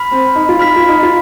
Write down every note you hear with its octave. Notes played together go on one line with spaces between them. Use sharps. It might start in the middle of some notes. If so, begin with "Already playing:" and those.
Already playing: B5 F6 B6
C4
D#4
F4
D#4 B5 F6 B6
F4
D#4
F4